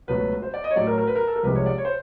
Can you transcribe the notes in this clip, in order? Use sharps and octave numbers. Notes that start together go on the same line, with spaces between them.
C#2 B2 F#3 A3 B4
C5
D5
D#5
C#5
A2 F#3 A3 D5
A#4
A#4
B4
A#4
A4
A#4
C2 C3 F3 G#3 B4
C#5
D5
C#5
C5